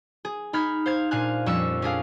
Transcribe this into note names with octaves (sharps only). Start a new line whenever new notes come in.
G#4
D#4 B5 F6 G#6
C5 F5 G#6
A#2 D4 F5 G#5 F#6
F2 G3 C#4 C#6 E6
C#4 D4 G#4 F5